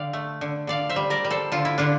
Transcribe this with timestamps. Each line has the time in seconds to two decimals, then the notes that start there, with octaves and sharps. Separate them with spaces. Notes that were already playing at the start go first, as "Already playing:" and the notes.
Already playing: D3 D5 F5 G5
0.13 A3
0.41 D3
0.67 D3 D5 F5
0.89 C5 E5
0.96 G3
1.10 A#4 D5
1.24 G3
1.30 A4 C5
1.52 D3 F4
1.65 E4
1.78 D3 D4 F4